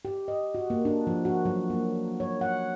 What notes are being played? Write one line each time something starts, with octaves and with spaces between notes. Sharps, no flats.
G4
D#5
F#4
A#3
D4
F3
F#4
F#3
A#3
C#5
F#5